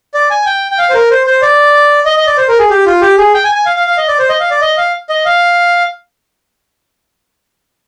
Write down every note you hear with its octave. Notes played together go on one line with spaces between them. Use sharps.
D5
G#5
G5
G5
F5
C5
A#4
C5
C5
D5
D#5
D#5
D5
C5
A#4
G#4
G4
F4
G4
G#4
G5
G#5
G#5
F5
F5
F5
D#5
D5
C5
D#5
F5
D5
D#5
F5
D#5
F5